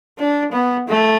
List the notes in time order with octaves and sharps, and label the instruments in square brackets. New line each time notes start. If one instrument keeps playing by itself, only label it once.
[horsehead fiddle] D4
B3
A3